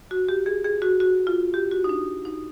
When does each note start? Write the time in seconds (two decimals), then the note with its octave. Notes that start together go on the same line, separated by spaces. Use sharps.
0.11 F#4
0.29 G4
0.46 G#4
0.64 G#4
0.82 F#4
1.00 F#4
1.27 F4
1.54 G4
1.71 F#4
1.84 D#4
1.89 D4
2.25 D#4